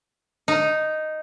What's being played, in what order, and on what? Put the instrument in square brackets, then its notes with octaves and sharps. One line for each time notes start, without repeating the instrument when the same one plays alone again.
[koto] D#4